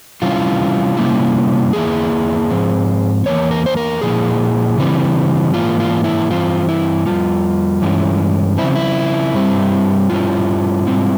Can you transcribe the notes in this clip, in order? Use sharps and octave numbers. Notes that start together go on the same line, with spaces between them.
C3 E3 G3 C#4 E4 F4
C3 G3 A#3 C#4 E4
E2 E3 A#3 E4 G#4
G#2 F3 C4
E2 E3 A#3 C#5
A#4
C5
A#4
A#2 F3 A#3 E4 G#4
C#3 E3 G3 C4
G#2 E3 A#3 F4
F4
E4
G2 E3 C4 F4
E4
F2 C3 G3 F4
G2 E3 G#3 C#4 E4
C#3 F3 C4 E4
E4
G2 G3 C4
G2 G3 C#4 E4 F4
G#2 G3 C4 E4